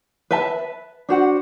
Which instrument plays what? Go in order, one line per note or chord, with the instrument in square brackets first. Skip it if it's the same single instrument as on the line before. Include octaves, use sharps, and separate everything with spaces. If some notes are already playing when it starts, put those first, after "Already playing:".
[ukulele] B4 E5 A5
D4 F#4 C5 F#5